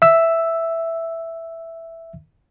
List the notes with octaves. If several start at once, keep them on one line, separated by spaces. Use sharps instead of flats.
E5 E6